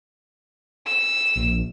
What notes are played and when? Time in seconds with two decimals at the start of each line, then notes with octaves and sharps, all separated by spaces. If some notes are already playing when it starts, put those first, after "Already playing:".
0.86 E6
1.36 A#1